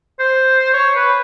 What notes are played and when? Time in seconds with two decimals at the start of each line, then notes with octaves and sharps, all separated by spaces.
0.19 C5
0.74 C#5
0.96 B4